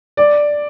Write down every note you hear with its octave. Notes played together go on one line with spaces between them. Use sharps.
D5